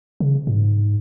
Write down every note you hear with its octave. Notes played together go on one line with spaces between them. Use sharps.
C#3
G#2